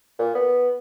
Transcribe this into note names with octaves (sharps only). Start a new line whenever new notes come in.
A#2
B3